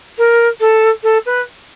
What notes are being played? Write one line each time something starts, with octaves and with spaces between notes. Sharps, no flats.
A#4
A4
A4
B4